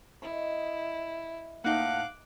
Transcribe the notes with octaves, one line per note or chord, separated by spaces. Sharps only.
E4 D#5 C#6
A2 A#3 D#4 F5 F#5 D6 F#6